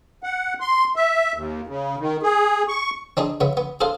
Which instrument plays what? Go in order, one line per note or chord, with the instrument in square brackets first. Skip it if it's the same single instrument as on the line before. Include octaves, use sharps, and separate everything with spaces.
[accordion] F#5
C6
E5
D#2
C#3
D#3
G#4
C#6
[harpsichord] C4 D4 D#4 G#4
C#3 B3 E5
B3
G#4 A4 C5 F5